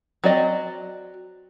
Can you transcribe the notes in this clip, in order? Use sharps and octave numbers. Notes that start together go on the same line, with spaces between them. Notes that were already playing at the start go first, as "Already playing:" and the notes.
F#3 C4 D5 D#5